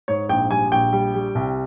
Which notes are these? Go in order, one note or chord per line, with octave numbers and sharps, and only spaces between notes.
G#2 C#5
A#1 G5
G3 G#5
A#1 G5
G3
G3
C2